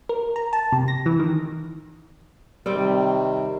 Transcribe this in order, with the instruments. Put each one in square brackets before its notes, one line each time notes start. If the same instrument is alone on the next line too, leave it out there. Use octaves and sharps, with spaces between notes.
[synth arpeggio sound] A#4
A#5
A5
C3
A#6
E3
D#3
[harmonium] C3 D#3 [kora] G3 C4 G5